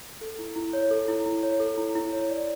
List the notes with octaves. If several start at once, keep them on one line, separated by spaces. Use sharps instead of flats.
A4
E4
E4
C#5
A4
E4
E4
C#5
A4
E4
E4
C#5
D5